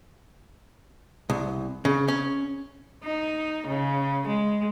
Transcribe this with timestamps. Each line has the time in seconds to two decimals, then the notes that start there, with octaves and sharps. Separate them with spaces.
1.30 C2
1.85 C#3
2.08 C#4
3.04 D#4
3.68 C#3
4.28 G#3